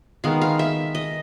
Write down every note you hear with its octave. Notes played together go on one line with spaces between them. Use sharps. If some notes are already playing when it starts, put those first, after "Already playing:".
D#3 G#3 B3 F5
F5
E5
D#5